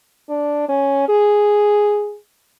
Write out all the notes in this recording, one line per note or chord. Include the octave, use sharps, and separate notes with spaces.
D4
C#4
G#4